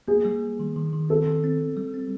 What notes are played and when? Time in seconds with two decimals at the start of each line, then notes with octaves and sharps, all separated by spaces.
0.08 A#3 G#4
0.25 G3
0.42 A#3
0.59 D#3
0.76 D#3
0.93 D#3
1.09 C4 A4
1.27 D#3
1.44 C4
1.61 C4
1.77 G3
1.94 C4